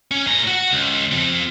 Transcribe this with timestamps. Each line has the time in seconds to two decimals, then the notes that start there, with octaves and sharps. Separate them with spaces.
0.11 C#4
0.27 A2 A#5
0.47 F#4
0.71 C#2
1.12 F3 C4